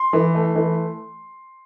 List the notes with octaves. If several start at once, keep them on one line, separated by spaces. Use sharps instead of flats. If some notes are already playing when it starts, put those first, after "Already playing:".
Already playing: C6
E3
A3
E3